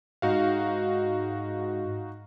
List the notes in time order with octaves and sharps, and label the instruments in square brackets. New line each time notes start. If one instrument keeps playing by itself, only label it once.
[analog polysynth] G#2 [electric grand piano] D#4 F#4 F5